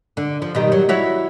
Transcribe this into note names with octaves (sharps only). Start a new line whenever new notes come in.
D3
F3
B2 D#3 G3
F#3
E4 F#4 C#5